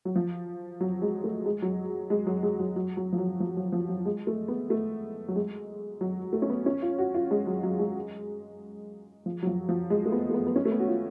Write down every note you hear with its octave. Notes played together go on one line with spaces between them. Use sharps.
F#3
F3
F#3
G#3
A3
G#3
F#3
G#3
F#3
G#3
F#3
F#3
F#3
F3
F#3
F3
F#3
F3
F#3
G#3
A3
B3
A3
F#3
G#3
F#3
A3
C#4
B3
C#4
F4
F#4
F4
G#3
F#3
F#3
G#3
F3
F#3
F3
F3
G#3
A3
B3
A3
B3
B3
C#4
A3
B3
F#4
F4